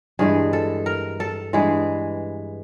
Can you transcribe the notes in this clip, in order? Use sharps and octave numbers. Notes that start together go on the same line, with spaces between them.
G2 E3 G#3 G#4
A4
A#4
A4
G2 E3 G#3 G#4